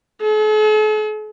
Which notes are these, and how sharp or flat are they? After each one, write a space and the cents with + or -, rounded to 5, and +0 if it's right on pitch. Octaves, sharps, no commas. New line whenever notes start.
A4 -45